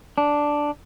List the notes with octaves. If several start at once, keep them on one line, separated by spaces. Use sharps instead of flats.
D4